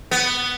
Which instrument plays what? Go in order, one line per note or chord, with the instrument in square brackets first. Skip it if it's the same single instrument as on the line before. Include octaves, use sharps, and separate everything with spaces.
[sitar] B3